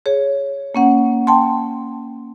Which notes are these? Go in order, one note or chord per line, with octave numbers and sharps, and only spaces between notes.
G#4 C#5
A#3 C#4 F#5
G5 A5 C6